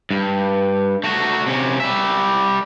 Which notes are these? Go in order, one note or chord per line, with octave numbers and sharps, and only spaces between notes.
G2
A3 F#4
C3 C#4
G3 E5